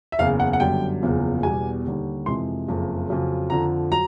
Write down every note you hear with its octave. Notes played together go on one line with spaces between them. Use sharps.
E5
F#1 E2 C#3 F5
F#5
F#5
G1 F#2 D3 G3 G5
F#1 E2 C#3 F3
E2 B2 G3 G#5
D#2 D3 G3
F2 C3 E3 G#3 C6
F#1 F2 C#3
F2 C#3 F#3
F2 D3 F3 A#5
F#3 A#5